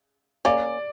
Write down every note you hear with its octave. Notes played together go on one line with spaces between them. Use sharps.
A#3 C#4 D5